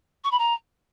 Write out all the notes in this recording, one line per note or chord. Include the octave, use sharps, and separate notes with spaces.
C#6
B5
A#5